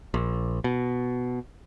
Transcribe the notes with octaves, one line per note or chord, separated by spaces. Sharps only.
A#1
B2